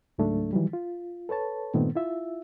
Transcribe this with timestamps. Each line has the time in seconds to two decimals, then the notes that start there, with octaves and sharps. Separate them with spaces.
0.18 C#2 G#2 F#3 A3 D4
0.53 D#3 E3 F#3 G3
0.73 F4
1.29 A4 B4 C#5 A5
1.74 G2 A#2 D#3 A3 B3 C4
1.95 E4 F4 E5